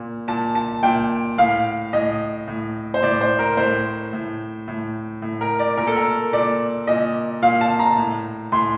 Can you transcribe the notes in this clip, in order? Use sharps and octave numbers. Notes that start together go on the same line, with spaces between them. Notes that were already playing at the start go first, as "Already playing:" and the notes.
Already playing: A#2
A#2 A5
A5
A#2 G5
A2 F5
A2 D#5
A2
C5
A2 D5
C5
A#4
A2 C5
A2
A2
A2
A#4
D5
A#2 A#4
A4
A#4
A#2 D5
A#2 D#5
A#2 F5
A5
A#5
A2
A2 C6